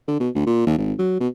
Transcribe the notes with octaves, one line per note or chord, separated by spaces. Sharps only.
D3
B2
D2
A#2
D#2
G#1
F#3
B2